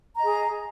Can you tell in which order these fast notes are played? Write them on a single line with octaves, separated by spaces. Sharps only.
A#5 D#5 G#4